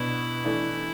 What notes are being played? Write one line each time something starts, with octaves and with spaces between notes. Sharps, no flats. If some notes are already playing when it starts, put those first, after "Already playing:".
Already playing: B2 B3 D4 E4
E3 A3 D4